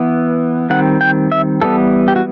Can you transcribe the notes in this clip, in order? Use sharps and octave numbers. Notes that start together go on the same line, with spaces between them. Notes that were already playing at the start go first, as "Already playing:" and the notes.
Already playing: E3 B3
D#3 G3 C4 F#5
G5
E5
E3 G3 B3 A4
G4
F#4